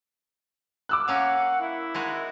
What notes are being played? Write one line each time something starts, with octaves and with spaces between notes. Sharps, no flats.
D6 E6 F#6
A#3 C#4 F5 F#5
E4
G#3 D#4 F#4